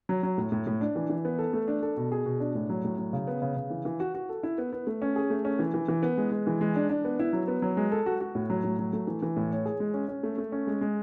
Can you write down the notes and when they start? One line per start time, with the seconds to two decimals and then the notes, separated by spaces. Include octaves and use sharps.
0.09 F#3
0.23 F#3
0.38 A2
0.52 A2
0.67 A2
0.81 D4
0.96 E3
1.10 E3
1.25 B3
1.39 A4
1.53 A3
1.68 D4
1.83 A4
1.97 B2
2.12 G#4
2.26 B2
2.40 D4
2.55 A2
2.69 F#3
2.85 A2
2.98 F#3
3.13 C#3
3.27 B3
3.42 C#3
3.56 C#3
3.70 E3
3.85 E3
4.00 F#4
4.15 F#4
4.29 A4
4.43 E4
4.58 B3
4.72 B3
4.87 A3
5.02 C#4
5.16 G#4
5.30 A3
5.45 C#4
5.59 E3
5.74 E3
5.88 E3
6.03 B3
6.18 G#3
6.32 G#3
6.47 E3
6.61 G#3
6.76 D4
6.90 D4
7.05 B3
7.19 E4
7.33 F#3
7.48 B3
7.62 F#3
7.77 G#3
7.92 A4
8.06 F#4
8.21 F#4
8.35 A2
8.50 F#3
8.64 A2
8.79 F#3
8.93 A3
9.07 E3
9.22 E3
9.36 A2
9.51 C#5
9.65 G#4
9.80 G#3
9.94 C#4
10.08 C#4
10.23 A3
10.38 A3
10.52 C#4
10.67 G#3
10.81 G#3